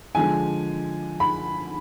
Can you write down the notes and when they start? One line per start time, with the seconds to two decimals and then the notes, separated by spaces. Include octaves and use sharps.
0.15 D3 F3 G#3 G#5
1.20 B5